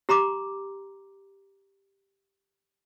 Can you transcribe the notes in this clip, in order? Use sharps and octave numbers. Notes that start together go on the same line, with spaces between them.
G4 A#5 C6 D6